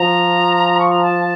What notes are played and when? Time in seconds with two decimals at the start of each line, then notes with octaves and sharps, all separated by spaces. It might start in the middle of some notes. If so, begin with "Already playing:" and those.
Already playing: F3 A#5
0.79 C#6
0.90 A#5
1.02 A5